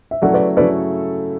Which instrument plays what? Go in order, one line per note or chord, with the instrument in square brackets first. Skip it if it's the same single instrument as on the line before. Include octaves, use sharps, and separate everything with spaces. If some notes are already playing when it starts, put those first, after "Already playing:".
[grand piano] E5
[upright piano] C#3 F#3 A3 E4 A4 [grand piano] D5 F#5
[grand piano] B4 D5
[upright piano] C#3 F#3 A3 E4 A4 [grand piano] B4 D5